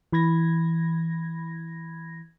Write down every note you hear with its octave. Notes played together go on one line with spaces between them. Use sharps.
E3 B5 G#6 A#6